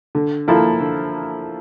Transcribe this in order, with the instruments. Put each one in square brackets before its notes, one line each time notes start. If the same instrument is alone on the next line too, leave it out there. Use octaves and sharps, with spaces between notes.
[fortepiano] D3
F3 A#3 E4 A4
D3